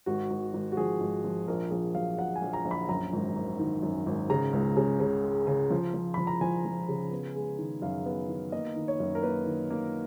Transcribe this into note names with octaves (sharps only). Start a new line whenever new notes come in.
G#1 F#4
G#1
G#1
F#4
F3 G#4
G#1
F3
A#1 A#4
A#1 G#4
F#3 F5
A#1 F#5
G#5
A#1
A#5
A#1
B5
F#2 A#5
G#1
G#1
D#3
F#2
G#1
C#3 A#5
C#2
C#3
C#3
G#3
C#3
F3
F3
F3 B5
A#5
F3 G#5
F3
C#3
B3
G#3
D#3
F#2 F5
B3
D#3
A#3 D#5
D#3
C#5
F#2
A#4
A#3 B4
D#3
A#3